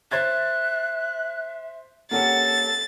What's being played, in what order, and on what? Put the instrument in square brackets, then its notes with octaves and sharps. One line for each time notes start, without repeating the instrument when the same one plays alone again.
[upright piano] C5 G#6 A6 [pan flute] E5 [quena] F#6
[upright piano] A#3 C#4 G4 [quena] A4 [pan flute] F#5 [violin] A6